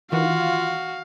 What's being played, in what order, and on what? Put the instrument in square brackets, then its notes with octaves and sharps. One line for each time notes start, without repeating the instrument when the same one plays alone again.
[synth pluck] D#3 E3 [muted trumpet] F4 [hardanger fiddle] F#4 [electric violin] F5